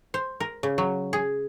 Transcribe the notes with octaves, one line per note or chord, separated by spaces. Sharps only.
C5
A#4
C#3
F#3
G#4